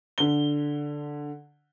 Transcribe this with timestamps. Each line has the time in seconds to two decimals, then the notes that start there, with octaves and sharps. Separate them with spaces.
0.18 D3 G7